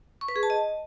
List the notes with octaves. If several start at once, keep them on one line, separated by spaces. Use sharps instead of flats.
C#6
B4
G#4
A5
D#5